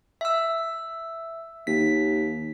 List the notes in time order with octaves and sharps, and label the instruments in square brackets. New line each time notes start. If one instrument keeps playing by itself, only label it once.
[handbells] E5 E6
[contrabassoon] D#2 [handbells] B6